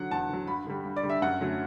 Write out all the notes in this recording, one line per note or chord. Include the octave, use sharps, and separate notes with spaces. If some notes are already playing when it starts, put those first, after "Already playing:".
Already playing: D3 F#3 F#5
E2 A5
D3 F#3
G2 B5
D3 G3
G2
D5
D3 G3
E5
F#2 F#5
D3 F#3 A3